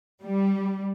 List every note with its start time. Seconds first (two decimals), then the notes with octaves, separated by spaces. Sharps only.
0.21 G3